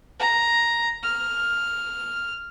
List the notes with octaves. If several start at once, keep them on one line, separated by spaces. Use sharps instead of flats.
A#5
F6